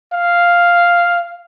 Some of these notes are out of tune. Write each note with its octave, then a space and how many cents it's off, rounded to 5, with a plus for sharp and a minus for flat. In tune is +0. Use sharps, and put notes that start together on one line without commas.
F5 +0